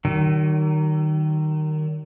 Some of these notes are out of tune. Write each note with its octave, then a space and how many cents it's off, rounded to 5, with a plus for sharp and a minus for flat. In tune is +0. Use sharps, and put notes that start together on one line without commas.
D#3 -15 F#3 +45